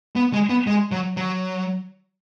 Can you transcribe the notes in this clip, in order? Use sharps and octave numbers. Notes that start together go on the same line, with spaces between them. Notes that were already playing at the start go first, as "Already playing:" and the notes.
B3
G#3
B3
G#3
F#3
F#3